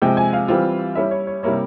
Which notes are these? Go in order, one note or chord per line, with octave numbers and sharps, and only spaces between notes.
C3 F3 G#3 G5
G#5
F5
E3 G3 C4 F4
G3 C#4 E4 E5
C#5
C#5
C3 G3 A#3 E4 C#5